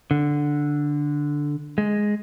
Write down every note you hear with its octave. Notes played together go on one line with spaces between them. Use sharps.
D3
G#3